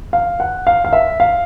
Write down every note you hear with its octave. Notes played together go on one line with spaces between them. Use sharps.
F5
F#5
F5
F5
E5
F5